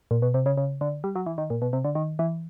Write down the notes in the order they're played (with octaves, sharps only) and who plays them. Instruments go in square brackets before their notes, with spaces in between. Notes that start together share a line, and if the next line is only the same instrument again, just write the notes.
[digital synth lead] A#2
B2
C3
C#3
C#3
D3
G3
F#3
E3
D#3
A#2
B2
C3
D3
D#3
E3